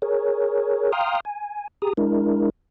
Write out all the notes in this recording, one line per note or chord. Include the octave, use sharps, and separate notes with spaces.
G#4 A#4 C#5
F5 G5 A#5 C6 D#6 F6
G#5
G4 G#4 A#5 D#6
G#3 D4 E4 A#4